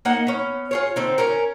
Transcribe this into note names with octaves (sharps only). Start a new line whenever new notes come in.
A#3 D#4 D#5 F#5
B3 C#4
F4 G#4 C#5
D3 C4 D#4
C#4 A#4